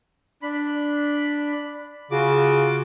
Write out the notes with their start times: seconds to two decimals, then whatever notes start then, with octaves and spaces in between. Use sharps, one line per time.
0.42 D4 B5
2.11 C#3 F4 F#4 D6